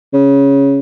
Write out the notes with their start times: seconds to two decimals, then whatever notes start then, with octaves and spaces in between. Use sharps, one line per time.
0.14 C#3